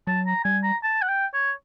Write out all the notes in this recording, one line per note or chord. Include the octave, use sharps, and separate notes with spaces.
F#3 A5
A#5
G3 G#5
A#5
A5
F#5
G5
C#5